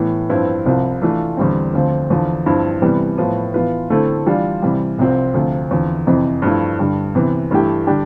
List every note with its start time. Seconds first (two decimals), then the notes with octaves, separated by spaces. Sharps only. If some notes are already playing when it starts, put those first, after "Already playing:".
Already playing: A2 E3 B3
0.29 G2 F3 C4 E4 B4
0.66 C2 C3 F3
1.02 E3 A3 D4 F4
1.37 E2 D3 G3 C4
1.74 D2 D3 F3 C4
2.10 E2 D3 F3
2.46 G2 F3 C4 E4
2.82 C3 E3 G3 B3
3.18 A2 F3 B3
3.54 E3 B3 F4 B4
3.90 D3 A3 C4 E4 A4
4.26 E3 G3 D4 F4
4.62 C3 E3 G3
4.99 C2 C3 F3 C4 F4
5.34 D2 C3 F3
5.71 E2 D3 F3 C4
6.07 F2 C3 E3
6.42 G2 F3 A3 E4
6.79 G2 D3 G3
7.15 C3 E3 B3
7.51 G2 E3 A3 E4 G4
7.87 D3 G3 D4 G4